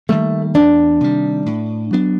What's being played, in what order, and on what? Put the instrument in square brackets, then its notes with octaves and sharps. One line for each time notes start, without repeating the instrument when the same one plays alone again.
[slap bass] D#3 G3 A#3 [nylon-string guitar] A3
[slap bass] E2 [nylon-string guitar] D4
[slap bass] C3 D#3 G3
A2
F#3 B3 D4